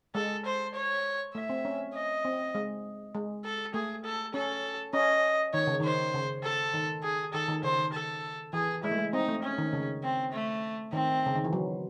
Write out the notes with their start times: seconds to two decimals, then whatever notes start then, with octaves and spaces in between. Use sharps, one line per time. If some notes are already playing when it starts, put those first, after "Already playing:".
0.15 G#3 A4
0.45 C5
0.75 C#5
1.35 A3 E5
1.50 C4
1.65 C#4
1.95 D#5
2.25 C4
2.55 G#3
3.15 G#3
3.45 A4
3.74 A3 G#4
4.05 A4
4.34 C#4 A4
4.94 C#4 D#5
5.54 D#3 C#5
5.67 C#3
5.80 D#3 C5
6.14 C#3
6.44 A4
6.73 D#3
7.03 G#4
7.33 D#3 A4
7.48 D#3
7.63 C#3 C5
7.79 D#3
7.93 A4
8.53 E3 G#4
8.83 G#3 E4
8.91 A3
8.98 G#3
9.13 C4 D#4
9.28 A3
9.43 C#4
9.58 D#3
9.73 C#3
10.03 C4
10.33 A3
10.93 D#3 C4
11.26 C#3
11.35 D#3
11.45 E3
11.53 F#3